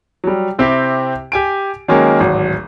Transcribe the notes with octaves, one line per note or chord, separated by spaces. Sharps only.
F#3 G3
C3 C4 E4 G4
G4 G#5 D7
D#3 F#3 G#3 A#3 C#4
D1 G#1 F#3